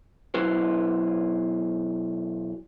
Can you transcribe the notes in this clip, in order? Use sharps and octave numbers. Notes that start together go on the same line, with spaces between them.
B2 F#3 E4 B4 C5